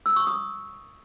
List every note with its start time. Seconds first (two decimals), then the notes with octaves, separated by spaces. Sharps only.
0.06 E6
0.16 C#6
0.27 D#6